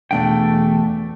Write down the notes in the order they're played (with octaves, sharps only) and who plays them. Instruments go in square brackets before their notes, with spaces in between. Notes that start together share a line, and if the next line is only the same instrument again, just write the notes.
[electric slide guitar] E2 G#3 G5 [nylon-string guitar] B2 D4 F5 [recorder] A3